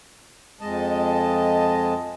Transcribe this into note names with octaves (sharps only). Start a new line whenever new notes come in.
F2 G#3 D#5 A5